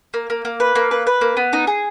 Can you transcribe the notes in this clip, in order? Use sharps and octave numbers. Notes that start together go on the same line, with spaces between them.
A#3
A#3
A#3
B4
A#3
B4
B4
A#3
B3
D#4
G#4